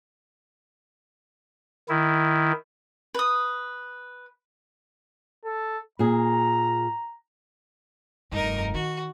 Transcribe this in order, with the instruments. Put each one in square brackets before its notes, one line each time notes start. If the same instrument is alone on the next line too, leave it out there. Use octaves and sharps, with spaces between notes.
[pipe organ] D#3 E4
[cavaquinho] B4 D#6
[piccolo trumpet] A4
[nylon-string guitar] A#2 G#4 [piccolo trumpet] A#5
[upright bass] F1 G2 [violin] D#4 A#4
[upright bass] D#3 [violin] F#4